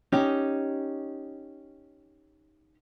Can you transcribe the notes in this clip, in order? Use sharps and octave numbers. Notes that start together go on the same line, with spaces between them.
C#4 D#4 G4